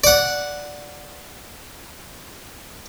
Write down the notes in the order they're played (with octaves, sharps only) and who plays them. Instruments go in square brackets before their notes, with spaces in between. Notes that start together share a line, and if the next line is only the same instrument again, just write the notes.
[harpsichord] D5 F#5